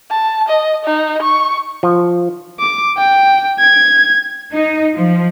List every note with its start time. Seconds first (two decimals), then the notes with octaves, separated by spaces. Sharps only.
0.11 A5
0.49 D#5
0.85 D#4
1.22 C#6
1.83 F3
2.60 D6
2.97 G5
3.59 G#6
4.53 D#4
4.96 F3